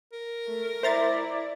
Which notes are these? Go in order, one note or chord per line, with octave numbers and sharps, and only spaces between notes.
A#4
A3
E4 C5 D5 E5 A#5 A6